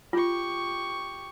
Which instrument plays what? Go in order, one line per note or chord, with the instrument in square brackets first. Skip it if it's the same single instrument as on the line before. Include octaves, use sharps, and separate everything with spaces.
[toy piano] F4 [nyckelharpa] G4 C#6